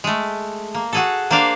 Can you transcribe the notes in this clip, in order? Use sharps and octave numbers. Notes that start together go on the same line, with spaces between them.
G#3 A3
A#3
F#4 G#4 A4
A#3 D4 C5 D5 F5